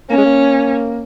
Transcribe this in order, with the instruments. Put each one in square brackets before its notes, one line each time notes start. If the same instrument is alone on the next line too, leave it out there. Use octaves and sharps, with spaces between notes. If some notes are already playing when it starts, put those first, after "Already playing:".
[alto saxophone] A#3 [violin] C#4
[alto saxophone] G#3
A#3